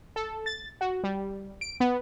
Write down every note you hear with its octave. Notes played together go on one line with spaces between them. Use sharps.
A4
A6
F#4
G3
D7
B3